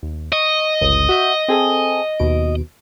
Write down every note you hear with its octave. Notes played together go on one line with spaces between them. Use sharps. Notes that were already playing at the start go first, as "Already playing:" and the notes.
D#2
D#5 C#6
G1 C#2
F#4 E5 G6
C4 G#4 A4
D#2 B2 D7